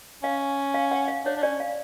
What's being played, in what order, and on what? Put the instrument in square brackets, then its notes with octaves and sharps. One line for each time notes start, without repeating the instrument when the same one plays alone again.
[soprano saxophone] C#4 [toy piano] F5
[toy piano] F5
F#5
F5
[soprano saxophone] D4 [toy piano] C#5
[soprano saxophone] D4
[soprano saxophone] C#4 [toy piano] D5
[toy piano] F5